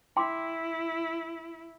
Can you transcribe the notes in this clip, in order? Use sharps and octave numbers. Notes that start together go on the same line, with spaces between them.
E4 G5 C6 D6